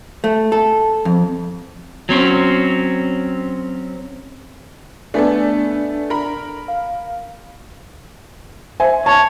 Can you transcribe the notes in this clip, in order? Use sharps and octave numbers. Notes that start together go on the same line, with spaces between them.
A3
A4
F2
F#3 C4 C#4
A3 B3 D4 A4 D5 G#5
A#4 B5
F5
C5 E5 G#5
C#5 A5